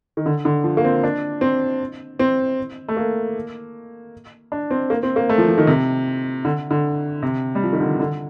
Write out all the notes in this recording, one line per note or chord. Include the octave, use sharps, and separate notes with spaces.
D#3
D3
D3
F3
A#3
C4
D4
C4
C4
A3
A#3
D4
C4
A#3
C4
A#3
A3
F3
F3
D#3
C3
D3
D3
C3
G3
F3
D#3
D3
D3